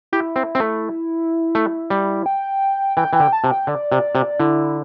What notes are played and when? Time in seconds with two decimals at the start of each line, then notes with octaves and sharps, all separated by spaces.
0.12 E4 G4
0.36 C4
0.55 C4
0.60 A3
1.55 A3
1.90 G3
2.26 G5
2.97 E3 G5
3.13 E3 G5
3.20 D3
3.33 A5
3.44 C3
3.51 G5
3.67 D3 D5
3.92 C3
4.15 C3
4.40 D3 E4